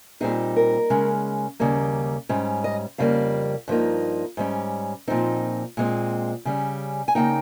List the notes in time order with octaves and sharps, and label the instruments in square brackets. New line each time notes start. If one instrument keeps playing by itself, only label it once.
[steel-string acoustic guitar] A#2 G3 C4 D#4 G#4
A#4
C#3 G#3 C#4
D#2 C#3 G3 A#3
G#2 G3 C#4
D#5
F2 C#3 G3 A#3 F5
G2 F3 A#3 D#4
G#2 G3 C#4
A#2 F3 C4 D#4
A#2 G#3 C4
C#3 G3 C#4
G#5
C#3 F3 A#3 D#4 G5